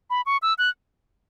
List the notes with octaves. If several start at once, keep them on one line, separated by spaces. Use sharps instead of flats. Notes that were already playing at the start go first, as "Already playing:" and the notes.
B5
C#6
E6
F#6